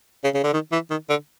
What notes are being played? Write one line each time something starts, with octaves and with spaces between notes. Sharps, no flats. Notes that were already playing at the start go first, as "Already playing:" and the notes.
C#3
C#3
D3
D#3
E3
D#3
D3